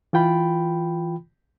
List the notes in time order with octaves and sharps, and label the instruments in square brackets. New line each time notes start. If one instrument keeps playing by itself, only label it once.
[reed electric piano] E3 F4 G5 B5